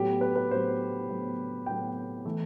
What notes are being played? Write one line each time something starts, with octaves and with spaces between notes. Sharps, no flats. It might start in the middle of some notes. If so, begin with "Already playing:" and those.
Already playing: A2 F#3 B3 G4
B4
B4
A2 F#3 B3 C5
A2 F#3 B3
A2 F#3 B3 G5
E3 A3